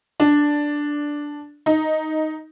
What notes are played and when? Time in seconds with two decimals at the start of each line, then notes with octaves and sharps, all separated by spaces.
0.20 D4
1.66 D#4